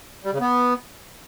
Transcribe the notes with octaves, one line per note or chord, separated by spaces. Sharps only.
G3
C#3
B3